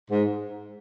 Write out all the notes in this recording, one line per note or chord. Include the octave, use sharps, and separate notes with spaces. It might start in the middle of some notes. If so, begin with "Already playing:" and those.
G#2